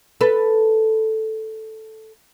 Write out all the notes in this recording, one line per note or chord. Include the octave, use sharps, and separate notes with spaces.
A4 B4